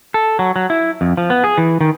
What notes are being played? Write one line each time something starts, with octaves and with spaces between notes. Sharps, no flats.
A4
F#3
F#3
E4
F2
F3
B3
G#4
E3
D#3